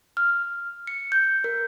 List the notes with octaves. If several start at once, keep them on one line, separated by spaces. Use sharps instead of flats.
F6
C#7
G6
A#4